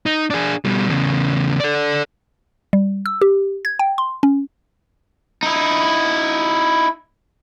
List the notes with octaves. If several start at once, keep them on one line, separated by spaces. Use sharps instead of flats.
D#4
D4 G#4
B2 G3
E2 C#3
A4 D5
G3
E6
G4
G#6
G5
C6
C#4
D#4 E4